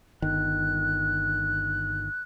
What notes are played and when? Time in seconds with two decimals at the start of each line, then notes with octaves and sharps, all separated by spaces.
0.22 G1 D#3 F#6